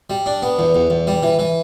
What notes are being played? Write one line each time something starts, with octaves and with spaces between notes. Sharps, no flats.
G3
D4
B3
E2
E2
E2
G3
E3
E3